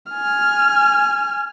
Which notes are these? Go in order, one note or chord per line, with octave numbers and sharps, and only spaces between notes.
G#5 F6